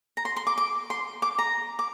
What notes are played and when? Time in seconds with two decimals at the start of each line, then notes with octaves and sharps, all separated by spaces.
0.17 A#5
0.25 C6
0.36 C6
0.47 D6
0.58 D6
0.90 C6
1.22 D6
1.38 A#5
1.79 D6